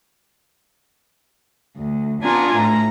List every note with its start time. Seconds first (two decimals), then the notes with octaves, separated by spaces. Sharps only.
1.77 D2
2.22 B3 D4 F4 G#5 A#5
2.54 A2 A#5